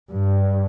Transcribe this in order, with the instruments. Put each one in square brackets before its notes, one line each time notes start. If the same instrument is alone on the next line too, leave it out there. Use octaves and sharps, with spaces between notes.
[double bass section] G2